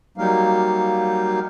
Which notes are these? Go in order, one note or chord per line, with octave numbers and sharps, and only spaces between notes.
F#3 G3 A#3 D#4 F5